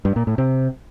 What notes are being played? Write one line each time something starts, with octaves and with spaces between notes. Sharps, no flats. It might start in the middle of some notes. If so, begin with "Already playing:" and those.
G2
A#2
A2
C3